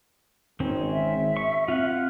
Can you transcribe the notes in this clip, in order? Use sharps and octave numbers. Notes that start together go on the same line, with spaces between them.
G#1 D#3 C4 C#4
E5
C#6
C4 F4 F5 F#5